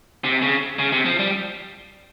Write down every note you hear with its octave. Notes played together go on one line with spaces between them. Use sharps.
C3
C#3
C#3
C3
F3
G3